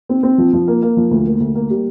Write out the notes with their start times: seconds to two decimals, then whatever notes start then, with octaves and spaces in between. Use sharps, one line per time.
0.09 C4
0.23 C4
0.38 F3
0.53 F3
0.68 A#3
0.82 A#3
0.97 F3
1.11 D2
1.26 A#3
1.40 D2
1.55 A#3
1.70 G3